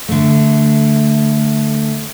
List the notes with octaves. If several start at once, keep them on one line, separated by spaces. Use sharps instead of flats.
D3 A3